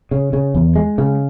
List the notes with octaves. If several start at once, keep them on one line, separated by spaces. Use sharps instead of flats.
C#3
C#3
E2
G#3
C#3